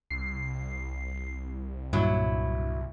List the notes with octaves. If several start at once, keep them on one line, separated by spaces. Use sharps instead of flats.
C2 C7
G2 A#2 F#3 E4